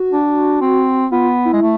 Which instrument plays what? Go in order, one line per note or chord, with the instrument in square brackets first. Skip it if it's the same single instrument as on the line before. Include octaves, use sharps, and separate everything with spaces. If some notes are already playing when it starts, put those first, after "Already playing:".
Already playing: [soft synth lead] F#4
[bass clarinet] D4
C4
[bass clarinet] B3 [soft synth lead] F4
[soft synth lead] E4
[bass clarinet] G#3
A3